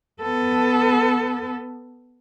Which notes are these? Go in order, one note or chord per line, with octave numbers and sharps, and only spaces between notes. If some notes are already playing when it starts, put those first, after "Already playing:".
B3 A4